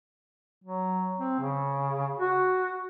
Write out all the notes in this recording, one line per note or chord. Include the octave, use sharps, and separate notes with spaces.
F#3
C4
C#3
F#4